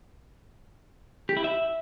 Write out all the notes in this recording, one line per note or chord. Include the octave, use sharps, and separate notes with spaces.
G4
E4
E5